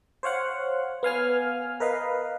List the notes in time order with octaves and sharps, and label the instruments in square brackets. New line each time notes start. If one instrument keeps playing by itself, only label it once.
[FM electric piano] C5 C#5 F5 F#5
B3 F5 G#5 F6
A#4 B4 D#5 F5